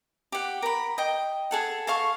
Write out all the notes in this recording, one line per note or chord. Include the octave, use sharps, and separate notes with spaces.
G4 F#5
A#4 B5
D#5 G5
G#4 A4 F#5
A4 F5 C#6